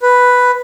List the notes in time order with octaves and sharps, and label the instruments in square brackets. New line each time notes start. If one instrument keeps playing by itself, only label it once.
[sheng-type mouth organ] B4